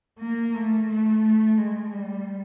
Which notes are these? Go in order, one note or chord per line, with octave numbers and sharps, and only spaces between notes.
A#3
A3
A3
G#3
G3